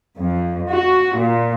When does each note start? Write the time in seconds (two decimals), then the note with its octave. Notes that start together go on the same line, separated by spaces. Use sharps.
0.17 F2
0.70 F#4
1.16 A#2